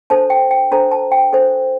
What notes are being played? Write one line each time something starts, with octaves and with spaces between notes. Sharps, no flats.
D4 A4 C5 A5
G5
G5
D4 A4 C5 A#5
A5
G5
D4 A4 C5